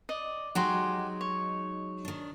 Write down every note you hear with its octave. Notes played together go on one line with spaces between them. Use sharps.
D5 D#5
F#3 G#3 D#4 F#4 G4 C6
C#5
D#3 D4